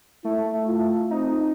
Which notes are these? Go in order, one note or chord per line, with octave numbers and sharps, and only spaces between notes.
A3 E4
F4
C4 D#4